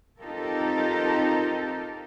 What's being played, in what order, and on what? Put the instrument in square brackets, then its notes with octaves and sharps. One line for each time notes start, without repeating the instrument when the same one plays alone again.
[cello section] C4 D#4 F4 G4 A4 A#4